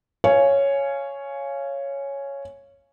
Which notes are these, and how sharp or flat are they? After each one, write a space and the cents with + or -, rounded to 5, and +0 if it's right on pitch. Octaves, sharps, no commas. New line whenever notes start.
C#5 +0 F5 -20 G#5 +5